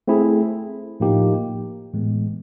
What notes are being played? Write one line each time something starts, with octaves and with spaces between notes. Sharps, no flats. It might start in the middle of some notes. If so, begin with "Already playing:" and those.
A3 C4 E4 G#4
A2 F3 A#3 D#4 G4
A2 E3 G#3 B3